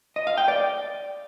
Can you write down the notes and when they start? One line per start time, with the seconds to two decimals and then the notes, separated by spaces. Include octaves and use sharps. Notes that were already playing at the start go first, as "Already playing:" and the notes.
0.16 D#5
0.27 F5
0.38 G5
0.48 D5